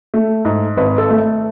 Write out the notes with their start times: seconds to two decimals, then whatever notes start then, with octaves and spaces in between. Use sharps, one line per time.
0.14 A3
0.45 G#2
0.77 G#1 B4
0.98 A4
1.10 A3